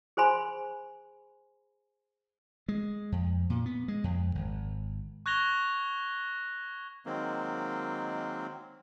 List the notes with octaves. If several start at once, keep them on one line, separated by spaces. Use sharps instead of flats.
G#4 C5 G#5 B5 C6
G#3
F2
A#2
B3
G#3
F2
G#1
C#6 F#6 G#6 A#6 F7 G7
D#3 F#3 G#3 A#3 C4